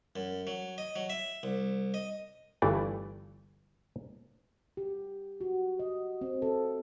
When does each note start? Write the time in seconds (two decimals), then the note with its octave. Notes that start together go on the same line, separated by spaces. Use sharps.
0.16 F#2
0.47 F#3
0.78 D#5
0.96 F#3
1.10 E5
1.43 C2
1.94 D#5
2.62 G1 G2 E3 A3 D5
4.77 G4
5.41 F#4
5.79 D#5
6.21 C4
6.42 A4